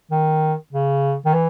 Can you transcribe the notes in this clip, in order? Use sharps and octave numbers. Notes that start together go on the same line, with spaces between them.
D#3
C#3
D#3
E3